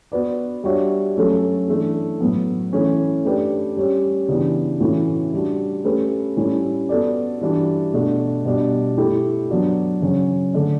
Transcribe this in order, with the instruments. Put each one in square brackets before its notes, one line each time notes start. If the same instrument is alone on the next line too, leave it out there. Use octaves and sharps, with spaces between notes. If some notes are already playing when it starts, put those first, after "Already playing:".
[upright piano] B3 F#4 B4 D5
G3 D4 F#4 C#5 E5
F#3 A3 C#4 F#4 A4
E3 A3 D4
A2 F#3 B3
E3 A3 C#4
A3 D4 G4 B4 D5
G3 C#4 G4 C#5
C#3 E3 B3 D4 G4
A2 E3 A3 C#4 F#4
G3 D4 F#4
A3 C#4 G4 B4
A2 G3 C#4 E4 A4
B3 F#4 A4 D5
E3 G3 D4 F#4
B2 A3 D4 F#4 A4
B2 G3 D4
A3 E4 G4
F#3 B3 D4 F#4
C#3 F#3 C#4
D3 A3 D4